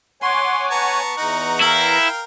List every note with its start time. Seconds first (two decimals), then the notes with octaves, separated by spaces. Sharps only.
0.22 C#5 F#5 G#5 C6 D6
0.71 B3 A5 A#5 C#6
1.17 E2 D#4 F#5 A#5
1.61 E4 A#4 F5 G5